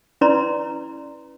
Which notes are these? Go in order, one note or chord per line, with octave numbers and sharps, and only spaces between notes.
C#4 E4 B4 D5 A#5 C6